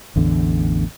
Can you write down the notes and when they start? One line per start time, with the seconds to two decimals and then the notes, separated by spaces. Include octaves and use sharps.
0.16 A1 E2 D3